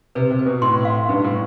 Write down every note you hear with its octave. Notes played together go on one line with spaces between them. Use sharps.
C3 B4
C3
B4
B2
A2 C6
F5
G2 B4
A2